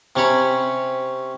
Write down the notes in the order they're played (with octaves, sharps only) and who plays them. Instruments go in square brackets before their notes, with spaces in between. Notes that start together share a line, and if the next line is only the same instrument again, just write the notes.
[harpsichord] C3 C#4 C#5 B5